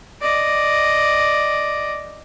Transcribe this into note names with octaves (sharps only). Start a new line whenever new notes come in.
D5 D#5